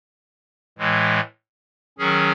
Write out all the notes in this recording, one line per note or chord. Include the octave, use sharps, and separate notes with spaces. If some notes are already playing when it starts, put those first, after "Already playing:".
A2 E3 G#3
D#3 F#3 C#4 G#4